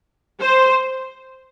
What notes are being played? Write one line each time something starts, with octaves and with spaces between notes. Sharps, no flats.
C5